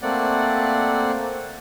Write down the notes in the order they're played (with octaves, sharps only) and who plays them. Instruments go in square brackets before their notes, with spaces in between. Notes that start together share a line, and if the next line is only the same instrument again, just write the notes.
[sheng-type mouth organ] A3 A#3 C4 D5 F#5